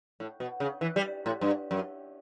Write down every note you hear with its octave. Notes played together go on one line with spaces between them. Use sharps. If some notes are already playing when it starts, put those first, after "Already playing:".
A2
B2
C#3
E3
G3
A2
G2
F#2